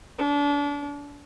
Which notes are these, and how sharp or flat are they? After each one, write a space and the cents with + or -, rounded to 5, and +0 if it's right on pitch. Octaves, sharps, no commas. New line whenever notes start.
D4 -30